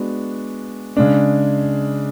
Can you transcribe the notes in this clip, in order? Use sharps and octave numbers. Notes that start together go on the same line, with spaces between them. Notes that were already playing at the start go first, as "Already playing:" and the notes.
Already playing: G#3 B3 D4 F#4
C#3 G#3 D4